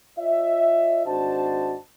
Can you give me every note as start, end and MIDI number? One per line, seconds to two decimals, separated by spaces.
0.18 1.03 65
0.18 1.03 73
0.18 1.03 75
0.18 1.03 76
1.06 1.75 32
1.06 1.75 62
1.06 1.75 66
1.06 1.75 72
1.06 1.75 75
1.06 1.75 81